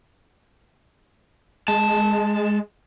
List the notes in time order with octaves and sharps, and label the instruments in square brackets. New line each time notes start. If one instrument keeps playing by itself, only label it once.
[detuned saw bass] G#3 [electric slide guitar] A5